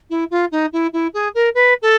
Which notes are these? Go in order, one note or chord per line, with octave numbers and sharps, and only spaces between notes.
E4
F4
D#4
E4
E4
G#4
A#4
B4
A4